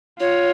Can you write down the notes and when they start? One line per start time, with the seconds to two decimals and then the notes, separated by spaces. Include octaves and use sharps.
0.19 F4 C#5